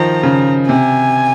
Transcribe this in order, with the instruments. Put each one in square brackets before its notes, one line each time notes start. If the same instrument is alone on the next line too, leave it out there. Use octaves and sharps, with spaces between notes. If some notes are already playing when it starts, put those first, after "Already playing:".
Already playing: [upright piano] D#3 F3 [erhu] A#5
[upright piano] C#3
[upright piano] C3 [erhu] G#5